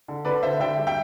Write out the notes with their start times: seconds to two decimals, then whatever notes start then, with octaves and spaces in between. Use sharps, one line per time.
0.08 D3
0.25 D3 B4 D5
0.43 D3 C5 E5
0.60 D3 E5 G5
0.78 G3
0.87 E5 G5